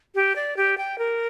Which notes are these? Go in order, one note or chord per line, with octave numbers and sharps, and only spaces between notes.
G4
D5
G4
G5
A#4